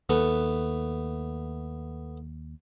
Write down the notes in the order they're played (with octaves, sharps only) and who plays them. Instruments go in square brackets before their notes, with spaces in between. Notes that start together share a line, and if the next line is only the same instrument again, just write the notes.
[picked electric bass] D#2 [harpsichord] A3 B3